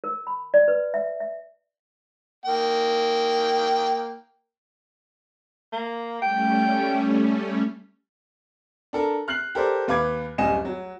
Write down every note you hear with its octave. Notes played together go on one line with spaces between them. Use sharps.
A#4
B5
D5
B4
E5
E5
A#3 G5
A#3
G3 A3 C#4 G5
D4 A4 A#4
F6 F#6 C7 F#7
G4 A4 A#4 C5 D5
D#2 B4 F5 D6 G#6
D1 F#2 G3 D#5 G#5 E7
F#3